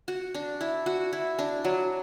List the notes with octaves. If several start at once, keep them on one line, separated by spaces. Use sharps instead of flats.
F#4
D4
E4
F#4
E4
D4
F#3